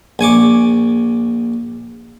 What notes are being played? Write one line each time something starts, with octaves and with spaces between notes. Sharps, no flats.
A#1 G#5 C#6 D6